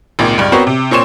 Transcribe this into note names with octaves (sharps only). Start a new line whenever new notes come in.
G#1 C#2 A#2
C#2 G2
B3 C4 F#4 A#4 C5 C#5
C3
A#2 C4 C#5 C6 E7